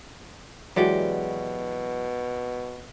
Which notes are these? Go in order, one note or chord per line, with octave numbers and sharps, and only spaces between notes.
B2 E3 F#3 G#3 F#4 G4 D5